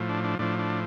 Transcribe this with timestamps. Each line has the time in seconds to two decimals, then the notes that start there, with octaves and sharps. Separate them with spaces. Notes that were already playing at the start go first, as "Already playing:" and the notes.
Already playing: A2 F3
0.09 D4
0.24 D4
0.39 A2 F3 D4
0.59 D4